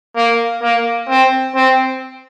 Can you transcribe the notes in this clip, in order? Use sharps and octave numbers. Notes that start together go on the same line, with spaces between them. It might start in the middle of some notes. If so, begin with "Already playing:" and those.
A#3
A#3
C4
C4